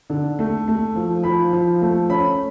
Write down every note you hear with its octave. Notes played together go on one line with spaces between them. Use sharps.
D3
A3
A3
F3
F3 B5
F3
A3
C#4 B5